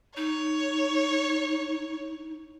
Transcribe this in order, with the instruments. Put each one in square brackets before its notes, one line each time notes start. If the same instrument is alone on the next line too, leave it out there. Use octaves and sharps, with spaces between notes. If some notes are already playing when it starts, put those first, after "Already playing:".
[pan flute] D#4 [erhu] C#5